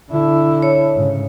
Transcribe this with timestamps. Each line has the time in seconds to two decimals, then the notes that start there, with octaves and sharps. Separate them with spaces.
0.10 D3 E4
0.62 C#5
0.95 G#2 C#3